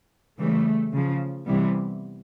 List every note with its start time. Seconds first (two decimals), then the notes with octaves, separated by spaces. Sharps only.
0.39 C#3 E3 G3 A3
0.92 C#3 F3
1.45 C3 E3 G3 B3